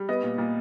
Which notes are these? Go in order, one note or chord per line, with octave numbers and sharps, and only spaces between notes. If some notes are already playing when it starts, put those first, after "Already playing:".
Already playing: G3
B3 D#5
A#2
A#2